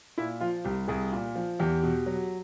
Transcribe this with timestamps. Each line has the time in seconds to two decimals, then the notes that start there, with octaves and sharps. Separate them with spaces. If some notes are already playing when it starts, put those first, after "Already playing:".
0.18 A#2 E4
0.41 F3 F4
0.65 C2 G4
0.88 C2 G#4
1.13 A#2
1.36 F3
1.59 E2 G4
1.83 B2
2.06 F#3